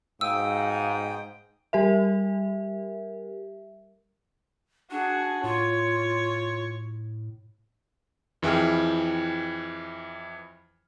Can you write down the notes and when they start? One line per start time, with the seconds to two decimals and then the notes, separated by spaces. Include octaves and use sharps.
0.21 G#2 B2 F5 G5 D#6 E6
1.73 G3 G4 A#4 E5
4.91 D4 F#4 G#4
5.44 A2 F4 C#5
8.42 F2 E3 E4 G#4 G5 F6